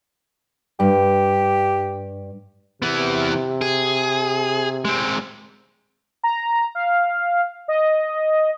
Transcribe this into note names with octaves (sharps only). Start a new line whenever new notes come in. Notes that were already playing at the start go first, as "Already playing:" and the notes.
G2 G4
C3 E3 B3
G#4
G#3 C4
A#5
F5
D#5